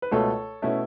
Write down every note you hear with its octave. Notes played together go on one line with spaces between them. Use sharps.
B4
C#2 B2 A3 A4 C#5
B2 A3 C#4 E4